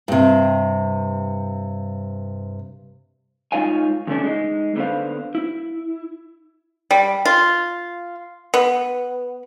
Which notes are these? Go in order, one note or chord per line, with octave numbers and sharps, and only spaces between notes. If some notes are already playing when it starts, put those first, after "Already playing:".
G2 C3
G#3 D#4 F4 C#5 F5 G#5
E2 C#3 A3 C#4 D4
G#3 D#4
D3 B3 C5 F5
E4
G3
F4
B3